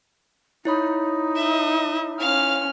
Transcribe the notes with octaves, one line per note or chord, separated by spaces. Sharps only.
D#4 E4 C#5 B5
D#5 E5
C#4 F5 F6